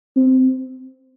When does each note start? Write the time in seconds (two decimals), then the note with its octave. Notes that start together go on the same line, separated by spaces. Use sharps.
0.16 C4